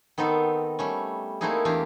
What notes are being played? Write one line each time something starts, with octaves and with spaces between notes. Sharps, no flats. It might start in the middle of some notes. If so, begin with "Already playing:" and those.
D#3 B3 C4 D#4 A4
G3 A3 C#4
A3 A#3 C4 D#4 E4 G#4
E2 D4 G4 F5